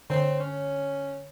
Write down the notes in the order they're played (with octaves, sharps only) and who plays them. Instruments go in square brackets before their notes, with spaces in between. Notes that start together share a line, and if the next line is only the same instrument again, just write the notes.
[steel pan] D3 [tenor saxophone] C4 [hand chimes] C#5
[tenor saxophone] C#4